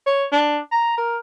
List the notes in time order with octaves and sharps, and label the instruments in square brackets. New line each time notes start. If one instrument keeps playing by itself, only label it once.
[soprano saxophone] C#5
D4
A#5
A#4